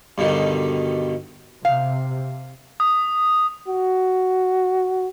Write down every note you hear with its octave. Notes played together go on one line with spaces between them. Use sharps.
G2 B2 D3 D#3
C3 F5
D#6
F#4